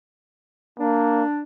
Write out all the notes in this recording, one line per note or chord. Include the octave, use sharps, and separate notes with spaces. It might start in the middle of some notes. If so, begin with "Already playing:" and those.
A#3 D4